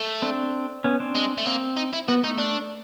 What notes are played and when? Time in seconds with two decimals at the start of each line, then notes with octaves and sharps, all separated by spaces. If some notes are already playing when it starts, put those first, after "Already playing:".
Already playing: A3
0.22 C4 D4
0.84 B3 C#4
1.00 C4 D4
1.15 G#3
1.38 A3
1.46 A#3 C4
1.77 D#4
1.93 E4
2.08 B3 F#4
2.23 A3 D#4
2.38 D4